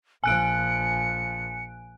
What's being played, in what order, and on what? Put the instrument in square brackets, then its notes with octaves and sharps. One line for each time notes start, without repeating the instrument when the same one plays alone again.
[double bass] A#1 F3 [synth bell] G#5 F#6 D7 [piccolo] C#7